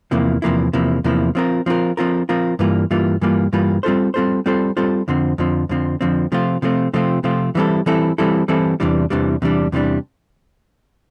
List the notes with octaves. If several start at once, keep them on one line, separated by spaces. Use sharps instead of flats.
E2 C3 F3 A#3 E4
E2 C3 F3 A#3 E4
E2 C3 F3 A#3 E4
E2 C3 F3 A#3 E4
F3 C4 F4 A#4
F3 C4 F4 A#4
F3 C4 F4 A#4
F3 C4 F4 A#4
G2 E3 G3 A#3 F4
G2 E3 G3 A#3 F4
G2 E3 G3 A#3 F4
G2 E3 G3 A#3 F4
G3 C4 F4 A4 C5
G3 C4 F4 A4 C5
G3 C4 F4 A4 C5
G3 C4 F4 A4 C5
F2 D3 F3 C4
F2 D3 F3 C4
F2 D3 F3 C4
F2 D3 F3 C4
C3 F3 A3 C4 F4
C3 F3 A3 C4 F4
C3 F3 A3 C4 F4
C3 F3 A3 C4 F4
E3 G3 C4 E4 A4
E3 G3 C4 E4 A4
E3 G3 C4 E4 A4
E3 G3 C4 E4 A4
E2 C3 E3 G3 D4
E2 C3 E3 G3 D4
E2 C3 E3 G3 D4
E2 C3 E3 G3 D4